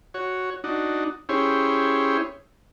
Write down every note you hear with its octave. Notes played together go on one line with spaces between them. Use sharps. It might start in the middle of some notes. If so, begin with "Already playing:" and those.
F#4 C#5
D4 D#4 F#4
C#4 E4 G4 G#4 C5 C#5